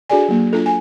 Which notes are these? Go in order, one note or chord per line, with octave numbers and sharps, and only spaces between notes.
D4 F#4 G#4 A4 D5 G#5
F#3 A#3
D4 F4 A4
G#5